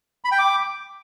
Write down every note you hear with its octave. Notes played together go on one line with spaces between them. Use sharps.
B5
G5
D6